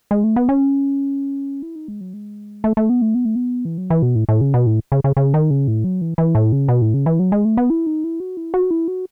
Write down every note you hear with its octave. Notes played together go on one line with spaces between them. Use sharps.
G#3
A3
B3
C#4
E4
D#4
G#3
F#3
G#3
A3
A3
B3
A3
B3
A3
B3
E3
F#3
E3
B2
A2
A2
C#3
B2
A2
C#3
C#3
C#3
D#3
C#3
A2
F#3
E3
E3
A2
C#3
B2
A2
C#3
E3
F#3
G#3
A3
B3
E4
D#4
E4
F#4
E4
F#4
E4
F#4